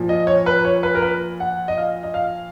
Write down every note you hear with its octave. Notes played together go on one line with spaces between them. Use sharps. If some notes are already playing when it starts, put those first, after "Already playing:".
Already playing: A#2 F3
D#5
C#5
B4
C#5
B4
A#4
B4
F#5
D#5
F5
D#5
F5